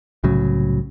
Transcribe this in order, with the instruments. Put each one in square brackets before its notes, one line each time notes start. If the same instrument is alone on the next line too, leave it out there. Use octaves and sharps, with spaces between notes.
[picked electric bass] C2 A2 C#3 F#3